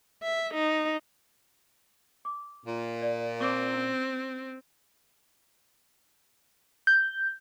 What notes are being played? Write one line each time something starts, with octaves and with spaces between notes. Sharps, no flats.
E5
D#4
D6
A#2
D5
C4 C#6 D6
C#4 E4 E6
G6